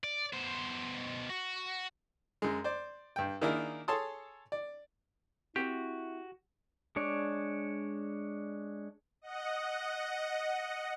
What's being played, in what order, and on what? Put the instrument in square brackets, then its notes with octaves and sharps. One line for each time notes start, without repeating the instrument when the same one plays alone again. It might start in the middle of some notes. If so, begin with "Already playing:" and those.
[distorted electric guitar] D5
B2 C5
F#4
[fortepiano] F#2 G#3
C5 D5
G2 G5
D#3 A#3 D4 E4 G#4 A#4
G#4 A4 C#5 A5 C6 D#6
D5
[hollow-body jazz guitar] C4 A#4 F#5 [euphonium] E4 [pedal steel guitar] F#4 [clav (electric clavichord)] G4
[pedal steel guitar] G#3 D4 C#5 D5
[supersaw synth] D#5 F#5